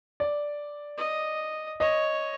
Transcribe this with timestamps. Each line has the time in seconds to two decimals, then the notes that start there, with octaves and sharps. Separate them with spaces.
0.20 D5
0.97 D#5
1.80 C#5 D#5